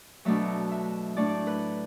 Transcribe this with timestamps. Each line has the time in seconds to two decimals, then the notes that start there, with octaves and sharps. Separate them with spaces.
0.25 B2 F#3 A3 D4 E5
0.72 E5
1.16 A2 A3 D4 D5
1.47 B4